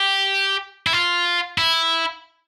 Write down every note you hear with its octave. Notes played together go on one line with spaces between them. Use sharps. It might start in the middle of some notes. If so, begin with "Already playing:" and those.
Already playing: G4
E4
F4
E4